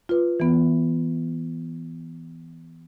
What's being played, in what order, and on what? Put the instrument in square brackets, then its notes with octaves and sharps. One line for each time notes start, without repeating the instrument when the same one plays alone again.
[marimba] F4 B4
E3 B3